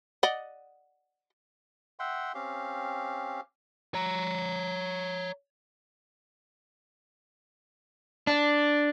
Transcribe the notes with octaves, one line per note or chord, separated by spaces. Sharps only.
D5 D#5 F#5
E5 F#5 G5 C6
C4 C#4 G4 F5
C#5 A#5
D4